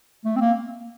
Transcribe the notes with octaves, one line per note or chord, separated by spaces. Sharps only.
A3
C4
A#3